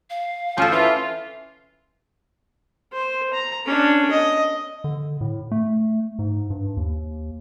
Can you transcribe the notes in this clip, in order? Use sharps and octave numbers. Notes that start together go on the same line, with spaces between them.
F5
F3 C#4 A4
E3 F4 E5
C5
A#5
C#4 D4
D#5
D3
A2
A3
G#2
G2
D#2